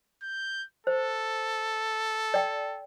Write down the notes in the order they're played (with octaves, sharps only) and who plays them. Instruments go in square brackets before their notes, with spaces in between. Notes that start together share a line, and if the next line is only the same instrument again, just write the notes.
[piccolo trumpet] G6
[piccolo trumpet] A4 [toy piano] C5
[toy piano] D5 G5